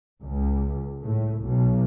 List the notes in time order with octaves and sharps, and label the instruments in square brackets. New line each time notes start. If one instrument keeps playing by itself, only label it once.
[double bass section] C#2
A2
B1